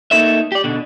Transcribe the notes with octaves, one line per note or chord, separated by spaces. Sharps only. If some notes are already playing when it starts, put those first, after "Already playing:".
A3 A#3 D#4 A4 C5 E5
G4 D5
B2 D3